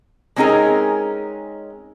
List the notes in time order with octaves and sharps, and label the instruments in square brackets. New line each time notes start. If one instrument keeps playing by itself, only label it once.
[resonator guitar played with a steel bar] G#3 C4 C#4 D#4 G#4 A#4